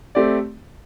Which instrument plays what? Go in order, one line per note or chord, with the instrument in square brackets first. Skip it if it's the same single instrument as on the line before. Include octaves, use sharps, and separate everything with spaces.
[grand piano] A3 C4 G4 D5